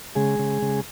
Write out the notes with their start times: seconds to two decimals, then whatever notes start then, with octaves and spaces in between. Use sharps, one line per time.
0.15 C#3 G#3 G#4
0.39 C#3
0.62 C#3